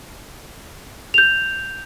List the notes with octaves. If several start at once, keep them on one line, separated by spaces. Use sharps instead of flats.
G6 F7